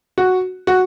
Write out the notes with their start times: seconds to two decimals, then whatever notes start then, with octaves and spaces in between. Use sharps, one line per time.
0.18 F#4
0.67 F#4